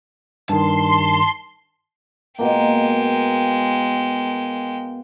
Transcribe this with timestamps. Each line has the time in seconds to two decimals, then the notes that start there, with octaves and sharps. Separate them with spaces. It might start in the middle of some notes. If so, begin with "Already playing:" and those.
0.49 G2 D#3 A5 C6
2.39 B2 G#3 A#3 G5